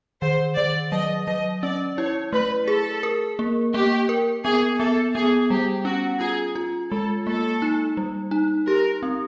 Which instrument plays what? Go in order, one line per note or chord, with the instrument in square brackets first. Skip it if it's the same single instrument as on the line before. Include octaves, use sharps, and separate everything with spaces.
[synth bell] D#3 [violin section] C5
[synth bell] D#3 [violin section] D5
[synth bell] F#3 [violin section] D#5
[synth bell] F#3 [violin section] D#5
[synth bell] C#4 [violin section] D5
[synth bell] E4 [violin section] C#5
[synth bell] A3 [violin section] B4
[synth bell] G#4 [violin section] A4
[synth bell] A#4
A#3
[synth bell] A#3 [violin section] G4
[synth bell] A#4
[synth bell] B3 [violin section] G#4
[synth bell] B3 [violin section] A4
[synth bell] B3 [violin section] G#4
[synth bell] G3 [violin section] G4
[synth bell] C#4 [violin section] F#4
[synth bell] F4 [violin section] G#4
[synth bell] F4
[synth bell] G#3 [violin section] A4
[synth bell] A#3 [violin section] A4
[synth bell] D#4
G3
D#4
[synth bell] G4 [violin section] A#4
[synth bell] C4